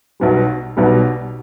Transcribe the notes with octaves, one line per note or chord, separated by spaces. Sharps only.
B1 B2 G3
B1 B2 G3